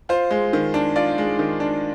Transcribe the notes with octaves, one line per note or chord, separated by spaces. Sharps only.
F4 C5
G#3
D#3
D4
F4 D5
G#3
D#3
D4